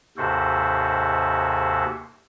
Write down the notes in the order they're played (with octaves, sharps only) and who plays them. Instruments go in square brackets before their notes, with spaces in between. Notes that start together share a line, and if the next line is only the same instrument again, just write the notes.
[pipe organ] D#2 G#2 C3 F#4 A4 C5